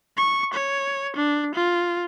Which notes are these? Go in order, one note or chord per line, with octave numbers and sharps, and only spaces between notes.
C#6
C#5
D4
F4